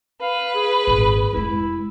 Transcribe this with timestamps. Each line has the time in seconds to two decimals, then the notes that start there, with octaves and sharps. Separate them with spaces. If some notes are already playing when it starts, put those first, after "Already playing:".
0.21 B4 F5
0.54 G#4
0.87 G#1 A#2
1.33 F1 G#3 E4